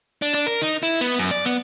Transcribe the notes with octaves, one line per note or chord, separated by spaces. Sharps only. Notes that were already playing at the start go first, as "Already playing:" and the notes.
D4
D4
A#4
D#4
E4
B3
F#2
D5
B3